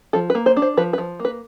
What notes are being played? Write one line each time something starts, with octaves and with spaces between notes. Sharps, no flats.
F3 A4
B4
A#3
C5
D4
C5
F3 B4
B4
F3
A#3
B4